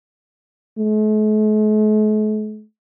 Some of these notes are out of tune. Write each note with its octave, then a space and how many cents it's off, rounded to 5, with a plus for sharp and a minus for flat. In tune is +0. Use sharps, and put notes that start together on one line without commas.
A3 -45